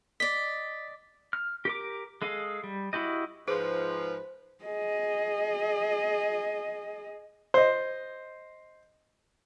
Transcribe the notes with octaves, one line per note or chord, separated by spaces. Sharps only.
D5 D#5 B6
F6
G4 A#4 D6
G#3 G#4 A4 F5
G3
E4 F#4 G4 D#5
G#2 F3 G#4 B4 C5
G#4 D#5
C5 D#5